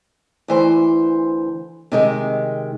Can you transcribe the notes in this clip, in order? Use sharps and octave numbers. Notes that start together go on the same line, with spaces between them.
D2 E3 C5
C3 D#3 G#3